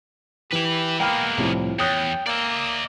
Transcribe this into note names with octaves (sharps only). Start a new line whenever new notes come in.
E3 G4 B4 E5
G#3 A#3 B3 G5 B5 F6
C2 A2 F3
E2 C#5 G5 D#6 F#6
A#3 D5 E5